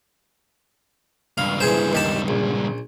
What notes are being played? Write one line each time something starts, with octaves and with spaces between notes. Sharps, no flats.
C#2 G2 F5
E3 G#4 C5
D#2 G4 A5
A#1